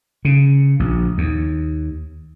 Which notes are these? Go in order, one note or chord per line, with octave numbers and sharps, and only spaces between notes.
C#3
A#1
D#2